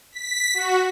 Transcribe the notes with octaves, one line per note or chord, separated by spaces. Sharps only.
B6
F#4